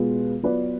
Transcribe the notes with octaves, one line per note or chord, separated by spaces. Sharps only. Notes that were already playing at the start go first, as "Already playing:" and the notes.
Already playing: B2 G#3 B3 F4 B4
F#3 B3 F4 B4 D5